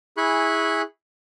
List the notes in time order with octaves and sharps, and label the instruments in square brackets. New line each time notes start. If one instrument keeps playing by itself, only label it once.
[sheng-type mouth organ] E4 G#4 G#5 B5 C#6 F#6